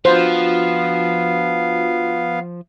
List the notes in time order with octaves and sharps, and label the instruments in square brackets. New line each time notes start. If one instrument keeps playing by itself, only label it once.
[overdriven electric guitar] F3 [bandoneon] B3 F5 [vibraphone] D4 F4 F#4 [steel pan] C5